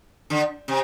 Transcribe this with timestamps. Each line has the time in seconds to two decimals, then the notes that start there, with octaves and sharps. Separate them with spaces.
0.30 D3
0.68 C3